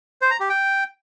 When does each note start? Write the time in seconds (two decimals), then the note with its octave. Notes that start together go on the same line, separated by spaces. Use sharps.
0.22 C5
0.31 A#5
0.40 G4
0.49 G5